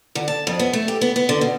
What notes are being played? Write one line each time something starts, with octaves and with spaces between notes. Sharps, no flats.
D3
A5
F2
B3
A3
G4
B3
B3
D3
B2